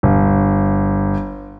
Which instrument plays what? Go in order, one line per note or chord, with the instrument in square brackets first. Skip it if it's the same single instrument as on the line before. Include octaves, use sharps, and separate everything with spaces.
[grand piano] G1